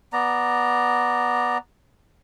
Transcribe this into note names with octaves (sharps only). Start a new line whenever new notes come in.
B3 D5 A#5